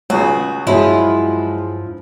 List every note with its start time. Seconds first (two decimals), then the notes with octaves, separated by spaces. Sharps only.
0.10 C#2 C#3 F#4
0.67 G2 F3 F#3 G#3 E4 F4